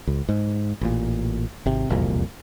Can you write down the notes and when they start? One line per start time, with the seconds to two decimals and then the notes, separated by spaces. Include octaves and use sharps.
0.07 C#2
0.29 G#2
0.81 A1 A#2
1.66 G#1 C3
1.90 E1 C2 F2 A#2